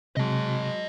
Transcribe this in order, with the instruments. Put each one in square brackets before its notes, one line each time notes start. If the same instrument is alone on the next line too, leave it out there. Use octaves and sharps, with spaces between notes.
[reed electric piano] C3 [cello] F#3 G#3 [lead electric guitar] D#5 A5